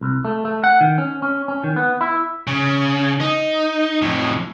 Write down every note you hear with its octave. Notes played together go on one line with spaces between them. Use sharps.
C2
A3
A3
F#5
D#3
C#4
C#4
C#4
D#3
B3
E4
C#3
D#4
F2 A2